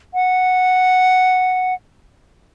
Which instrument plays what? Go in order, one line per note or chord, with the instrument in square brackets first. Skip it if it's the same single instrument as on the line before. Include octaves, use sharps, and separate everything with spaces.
[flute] F#5